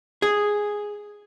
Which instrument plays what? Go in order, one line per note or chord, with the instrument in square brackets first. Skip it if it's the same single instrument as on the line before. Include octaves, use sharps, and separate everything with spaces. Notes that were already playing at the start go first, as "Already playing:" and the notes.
[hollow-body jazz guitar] G#4